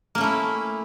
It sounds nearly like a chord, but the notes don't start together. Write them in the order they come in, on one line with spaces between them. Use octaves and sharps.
A#3 C#4 A3 E4